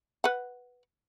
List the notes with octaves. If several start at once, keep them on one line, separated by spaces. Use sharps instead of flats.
B4 F#5